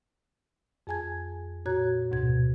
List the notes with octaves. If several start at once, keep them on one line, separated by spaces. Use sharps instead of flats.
F2 G#4 G#5 A5 G#6
A#2 F#4 C#5 A#5 F#6 G#6
D2 G#2 B2 G#6